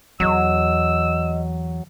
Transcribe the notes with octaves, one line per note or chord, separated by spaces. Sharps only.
E2 F#3 D#5 E6